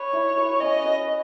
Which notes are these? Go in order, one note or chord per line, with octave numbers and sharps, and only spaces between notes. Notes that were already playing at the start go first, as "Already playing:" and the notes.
Already playing: B4 C#5
E4
B4
C#4 D#5
B4